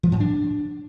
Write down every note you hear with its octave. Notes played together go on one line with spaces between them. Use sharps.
F3
G#2
D4